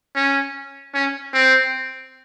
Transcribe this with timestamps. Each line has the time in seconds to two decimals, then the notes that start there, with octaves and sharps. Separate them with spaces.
0.16 C#4
0.94 C#4
1.34 C4